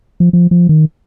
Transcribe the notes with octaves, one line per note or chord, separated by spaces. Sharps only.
F3
F3
F3
D#3